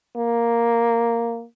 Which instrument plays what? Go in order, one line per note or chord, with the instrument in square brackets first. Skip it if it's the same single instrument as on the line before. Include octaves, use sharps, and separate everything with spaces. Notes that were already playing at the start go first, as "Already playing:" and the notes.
[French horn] A#3